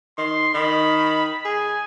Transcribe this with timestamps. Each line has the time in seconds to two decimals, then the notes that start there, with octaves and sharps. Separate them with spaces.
0.18 D#3 C6
0.54 D#3 B5
1.45 G#4 G#5